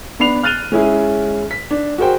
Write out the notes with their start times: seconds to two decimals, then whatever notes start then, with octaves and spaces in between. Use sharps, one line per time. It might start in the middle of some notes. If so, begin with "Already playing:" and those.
0.19 B3 D4 B5 C7 F7
0.43 F6 F#6 A6 D#7 F7 G7
0.72 G#3 C#4 E4 G#4
1.51 B6
1.71 D4
1.98 F#4 G#4 A#4 C5 G5